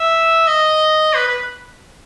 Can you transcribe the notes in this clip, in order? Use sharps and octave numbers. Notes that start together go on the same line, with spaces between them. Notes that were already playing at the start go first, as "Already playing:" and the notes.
Already playing: E5
D#5
B4
B4